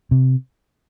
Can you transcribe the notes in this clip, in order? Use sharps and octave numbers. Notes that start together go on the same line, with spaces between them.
C3